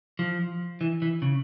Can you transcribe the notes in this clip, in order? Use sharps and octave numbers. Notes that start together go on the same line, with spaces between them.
F3
E3
E3
C#3